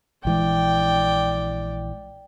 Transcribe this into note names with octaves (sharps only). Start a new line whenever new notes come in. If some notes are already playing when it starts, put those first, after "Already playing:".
A#1 E3 G#3 D5 G5